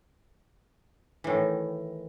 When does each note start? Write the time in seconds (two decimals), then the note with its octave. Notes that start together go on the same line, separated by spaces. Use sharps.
1.24 E3
1.27 A2
1.30 D#3